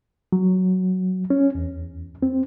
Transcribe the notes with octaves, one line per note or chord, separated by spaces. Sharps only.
F#3
C#4
E2
C4